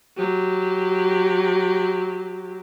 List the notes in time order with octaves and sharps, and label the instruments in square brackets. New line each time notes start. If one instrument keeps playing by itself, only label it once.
[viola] F#3 G4